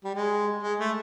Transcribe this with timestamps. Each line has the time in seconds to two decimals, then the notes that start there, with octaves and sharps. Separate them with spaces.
0.04 G3
0.15 G#3
0.62 G#3
0.80 A3